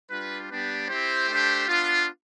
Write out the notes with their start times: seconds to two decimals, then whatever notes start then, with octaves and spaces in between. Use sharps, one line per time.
0.10 G3 D4 F4 B4
0.50 G3 B3 D4 G4 B4
0.89 C4 E4 G4 C5
1.29 A3 D4 G4
1.68 B3 D4 F4